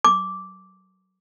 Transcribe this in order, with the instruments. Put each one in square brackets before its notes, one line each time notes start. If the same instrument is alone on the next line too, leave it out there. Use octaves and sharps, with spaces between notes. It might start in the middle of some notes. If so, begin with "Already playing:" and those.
[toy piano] D6